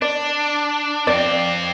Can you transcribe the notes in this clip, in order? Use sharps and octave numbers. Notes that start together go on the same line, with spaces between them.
D4 D5
F2 C4 D5